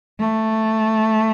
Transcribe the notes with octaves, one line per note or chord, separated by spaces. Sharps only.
A3